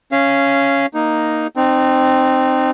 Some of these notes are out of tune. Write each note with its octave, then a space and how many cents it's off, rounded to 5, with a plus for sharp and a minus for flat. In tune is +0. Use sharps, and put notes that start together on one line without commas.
C#4 +0 F5 -20
A#3 +0 D#4 +0
C4 +0 D#4 -30